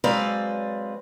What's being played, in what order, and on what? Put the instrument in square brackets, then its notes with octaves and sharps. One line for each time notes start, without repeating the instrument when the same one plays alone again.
[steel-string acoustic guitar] F#3 G#3 C4 B4 D5 F5